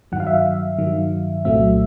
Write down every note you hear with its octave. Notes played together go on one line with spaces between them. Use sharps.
G2 D#3 F#3 F#5
F5
E5
F5
G2 D#3 F#3
C2 A#2 F#3 A3 C4 E5